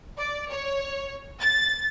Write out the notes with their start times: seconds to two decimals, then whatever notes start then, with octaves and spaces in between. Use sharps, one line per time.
0.17 D5
0.49 C#5
1.40 A6